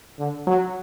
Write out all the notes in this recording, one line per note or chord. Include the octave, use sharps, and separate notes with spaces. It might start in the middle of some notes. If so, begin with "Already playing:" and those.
D3
F#3